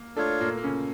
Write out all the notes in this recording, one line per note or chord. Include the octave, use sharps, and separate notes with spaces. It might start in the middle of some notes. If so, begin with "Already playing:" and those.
Already playing: A#3
A3 D4 F4 A4 C#5
A#2 A#3
A#3
C#3 C#4